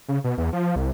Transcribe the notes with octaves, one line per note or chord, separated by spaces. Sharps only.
C#3
B2
E2
F3
C2